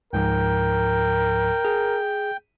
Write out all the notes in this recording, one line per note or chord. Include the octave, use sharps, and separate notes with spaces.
C#2 G#2 F3 A#4 G5
G#4